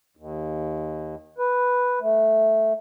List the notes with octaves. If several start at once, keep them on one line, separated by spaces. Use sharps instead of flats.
D#2
B4
A3